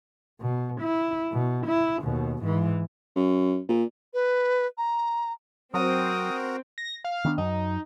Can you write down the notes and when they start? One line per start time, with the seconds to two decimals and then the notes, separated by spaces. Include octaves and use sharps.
0.41 B2
0.81 E4
1.33 B2
1.68 E4
2.01 D#2 B2
2.43 G#2 E3
3.16 F#2
3.69 A#2
4.14 B4
4.78 A#5
5.74 F#3 C4 F#4 A#4 D#6
6.78 A#6
7.04 F5
7.25 D#3 B3 D4
7.38 F#2 F#3 D#4